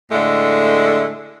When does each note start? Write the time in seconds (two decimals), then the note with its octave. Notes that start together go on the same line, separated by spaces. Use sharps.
0.12 A2 D3 G#3 A3